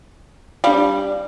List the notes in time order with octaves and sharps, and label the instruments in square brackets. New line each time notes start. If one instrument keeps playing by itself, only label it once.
[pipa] G3 [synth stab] D4 F5